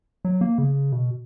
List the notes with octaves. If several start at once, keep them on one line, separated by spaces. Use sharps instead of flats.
F#3
A#3
C#3
B2